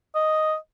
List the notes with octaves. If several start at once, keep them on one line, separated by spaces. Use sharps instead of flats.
D#5